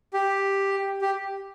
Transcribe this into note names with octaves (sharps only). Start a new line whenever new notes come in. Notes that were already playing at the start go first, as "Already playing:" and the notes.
G4
G4